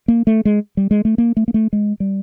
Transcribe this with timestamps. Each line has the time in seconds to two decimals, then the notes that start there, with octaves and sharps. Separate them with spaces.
0.08 A#3
0.27 A3
0.45 G#3
0.77 G3
0.91 G#3
1.05 A3
1.18 A#3
1.37 A3
1.48 A#3
1.54 A3
1.73 G#3
2.00 G3